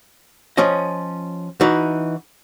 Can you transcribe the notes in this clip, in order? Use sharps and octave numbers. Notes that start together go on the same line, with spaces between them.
F3 C#4 D#5
E3 D#4 F#4